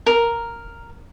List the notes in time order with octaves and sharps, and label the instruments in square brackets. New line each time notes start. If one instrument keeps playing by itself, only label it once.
[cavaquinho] A#4